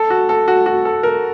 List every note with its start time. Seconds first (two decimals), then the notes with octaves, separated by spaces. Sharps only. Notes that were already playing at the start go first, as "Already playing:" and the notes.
Already playing: A4
0.10 F#4
0.29 A4
0.48 F#4
0.66 F#4
0.85 A4
1.03 A#4